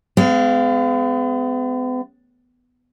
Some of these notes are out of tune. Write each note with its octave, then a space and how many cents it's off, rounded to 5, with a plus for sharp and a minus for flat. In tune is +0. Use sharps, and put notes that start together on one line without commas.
G#3 +20 B3 +45 F5 -20